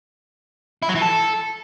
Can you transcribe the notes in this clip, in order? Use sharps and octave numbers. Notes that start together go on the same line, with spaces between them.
E4
F#3
E3
A4